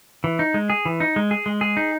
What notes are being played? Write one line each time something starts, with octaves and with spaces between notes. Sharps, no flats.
E3
D#4
G#3
G#4
E3
D#4
G#3
G#4
G#3
G#4
D#4